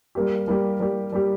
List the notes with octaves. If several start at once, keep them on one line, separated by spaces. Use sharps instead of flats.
G3 A#3 G4
G3 A#3 G4
G3 A#3 G4
G3 A#3 G4